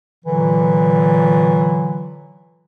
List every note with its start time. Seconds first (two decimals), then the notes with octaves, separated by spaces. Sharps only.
0.25 A#2 D3 E3 F#3